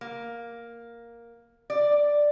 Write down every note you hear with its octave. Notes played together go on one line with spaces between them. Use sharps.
A#3
D5